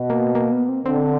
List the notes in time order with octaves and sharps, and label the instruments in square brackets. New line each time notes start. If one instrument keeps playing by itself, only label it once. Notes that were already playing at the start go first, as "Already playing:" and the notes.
Already playing: [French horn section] B2
[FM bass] A#3
A#3
B3
C4
[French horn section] D3 [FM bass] C4